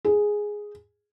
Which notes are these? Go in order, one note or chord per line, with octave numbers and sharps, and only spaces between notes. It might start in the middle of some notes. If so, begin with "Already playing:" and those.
G#4